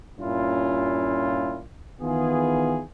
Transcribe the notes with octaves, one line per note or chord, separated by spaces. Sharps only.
G2 A#2 C#4 E4 F4
D#3 E3 B3 F4 G#4